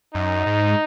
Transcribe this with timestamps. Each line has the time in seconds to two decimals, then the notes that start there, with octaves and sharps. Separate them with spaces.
0.14 F#2 D#4
0.46 G#2